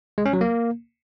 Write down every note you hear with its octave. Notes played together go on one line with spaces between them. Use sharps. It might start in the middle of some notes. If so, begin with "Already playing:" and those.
G#3
C#4
F#3
A#3